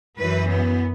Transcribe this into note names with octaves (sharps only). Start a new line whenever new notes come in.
F#2 E3 B4
B3